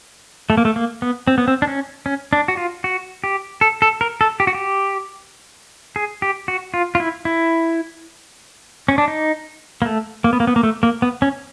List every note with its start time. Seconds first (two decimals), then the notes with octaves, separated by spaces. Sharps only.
0.50 A3
0.57 A#3
0.65 A3
0.76 A#3
1.02 B3
1.27 C4
1.38 B3
1.48 C4
1.62 D4
1.67 C#4
2.06 C#4
2.33 D4
2.48 F#4
2.57 F4
2.84 F#4
3.24 G4
3.61 A4
3.82 A4
4.01 A#4
4.21 A4
4.40 G4
4.47 F#4
4.55 G4
5.96 G#4
6.22 G4
6.48 F#4
6.74 F4
6.95 F4
7.00 E4
7.25 E4
8.88 C#4
8.98 D4
9.08 D#4
9.82 A#3
9.85 A3
10.24 A#3
10.33 B3
10.40 A#3
10.47 B3
10.56 A#3
10.63 A3
10.83 A#3
11.02 B3
11.22 C#4